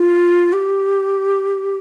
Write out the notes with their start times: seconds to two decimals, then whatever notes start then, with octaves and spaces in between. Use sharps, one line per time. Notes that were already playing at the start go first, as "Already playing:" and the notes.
Already playing: F4
0.53 G4